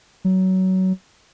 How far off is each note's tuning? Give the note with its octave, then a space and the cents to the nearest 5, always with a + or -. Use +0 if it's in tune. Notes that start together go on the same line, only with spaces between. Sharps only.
F#3 +20